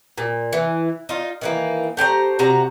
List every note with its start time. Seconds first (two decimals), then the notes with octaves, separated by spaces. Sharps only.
0.18 A#2
0.53 E3
1.09 D#4 F4
1.41 D#3 E3 A#3
1.97 A3 G4 C5 A#5
2.39 C3 F#4 A#5